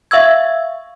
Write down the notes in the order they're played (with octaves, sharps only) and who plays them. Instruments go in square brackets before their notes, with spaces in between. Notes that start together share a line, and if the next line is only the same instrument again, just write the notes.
[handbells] E5 F5 C#6 E6 G#6